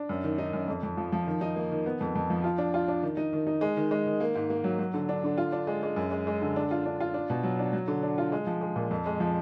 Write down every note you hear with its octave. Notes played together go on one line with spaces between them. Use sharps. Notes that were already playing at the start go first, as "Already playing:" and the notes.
Already playing: D4
F#2
D#3
D#4
F#2
F2
F2
F3
F3
D#3
D#4
A#3
D#3
B3
F2
F2
F3
F4
D4
F4
D4
D#3
D#4
D#3
D#4
G#3
D#3
G#3
D#3
A#3
G#2
A#3
F#3
F#3
D3
D4
D3
F4
D4
G#3
G#3
F#2
G#3
G#3
D3
D4
F4
D4
F4
D4
B2
F#3
D4
F#3
D3
D4
F4
G#3
F3
G#3
A#2
F2
G#3
F3